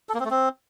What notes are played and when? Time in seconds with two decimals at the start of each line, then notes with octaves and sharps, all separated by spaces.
0.09 A4
0.14 A#3
0.20 C4
0.25 A3
0.30 C4